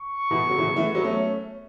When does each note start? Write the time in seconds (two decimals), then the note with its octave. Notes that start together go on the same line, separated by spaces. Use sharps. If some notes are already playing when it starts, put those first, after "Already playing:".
Already playing: C#6
0.31 B2 E3
0.49 C#3 F#3
0.58 B2 E3
0.67 C#3
0.76 E3 A3
0.95 F#3 B3
1.04 A3 C#4